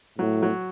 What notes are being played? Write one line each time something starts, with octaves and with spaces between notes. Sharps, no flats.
A2 F#3
F#3